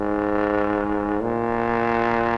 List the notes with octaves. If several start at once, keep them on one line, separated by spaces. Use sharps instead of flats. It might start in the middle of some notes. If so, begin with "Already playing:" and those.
Already playing: G#2
A#2